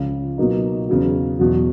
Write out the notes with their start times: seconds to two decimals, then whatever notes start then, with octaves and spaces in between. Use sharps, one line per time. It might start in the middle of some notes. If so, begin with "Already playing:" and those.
Already playing: C#2 C#3 F3
0.38 B2 F#3 A#3 D#4
0.89 E2 C#3 F#3
1.39 E2 B2 F#3